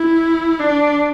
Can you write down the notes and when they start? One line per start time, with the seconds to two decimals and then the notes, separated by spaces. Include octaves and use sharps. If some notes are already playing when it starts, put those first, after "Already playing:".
Already playing: E4
0.59 D4